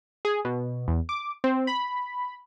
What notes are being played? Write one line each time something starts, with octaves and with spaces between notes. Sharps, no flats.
G#4
B2
E2
D6
C4
B5